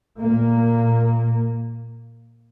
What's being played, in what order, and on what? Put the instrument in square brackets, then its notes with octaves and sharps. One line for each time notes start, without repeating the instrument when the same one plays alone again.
[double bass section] A#2 A#3